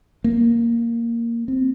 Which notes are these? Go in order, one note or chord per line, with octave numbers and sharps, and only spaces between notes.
A#3
C4